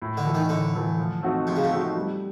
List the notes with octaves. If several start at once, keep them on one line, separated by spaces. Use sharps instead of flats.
A2
D3
E3 A3
D#3
A2 D3
E3 A3
F3
A3 C4 D#4 F#4
C3 F3
C#3
C3
A3 C4 D#4 F#4
G3